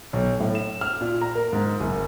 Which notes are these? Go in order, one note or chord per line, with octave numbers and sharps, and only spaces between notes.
B1
A2
E7
F6
A#2
A#5
A#4
G#2
F#1